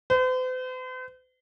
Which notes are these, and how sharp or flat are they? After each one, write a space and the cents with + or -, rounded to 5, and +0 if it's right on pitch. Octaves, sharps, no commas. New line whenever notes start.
C5 -45